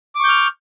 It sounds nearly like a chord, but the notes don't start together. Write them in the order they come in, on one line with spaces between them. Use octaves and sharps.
D6 C#6 G6 F6